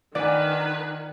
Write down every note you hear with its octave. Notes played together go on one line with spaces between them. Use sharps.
D#3 D4 B4 D5 F#5 G#5